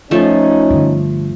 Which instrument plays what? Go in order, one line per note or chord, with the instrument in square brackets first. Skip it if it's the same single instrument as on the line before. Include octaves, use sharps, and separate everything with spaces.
[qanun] F3 A3 [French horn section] C#4 D#4
[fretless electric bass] G2 D3